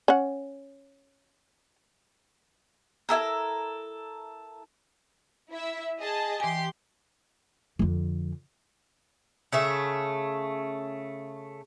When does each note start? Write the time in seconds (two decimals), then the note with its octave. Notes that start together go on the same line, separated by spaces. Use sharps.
0.08 C#4 F#5
3.09 E4 A4 A#4
5.51 E4 E5
5.99 G#4 D#5 A5
6.40 E3 G4 G#5 C6
7.79 F2 D3
9.53 C#3 A3 E5